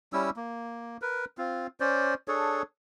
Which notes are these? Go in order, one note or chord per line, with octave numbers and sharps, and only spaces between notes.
G3 C#4 E4 E6
A#3
A#4 B4
C4 F4
C#4 C5 D5
D4 G#4 A4 C#5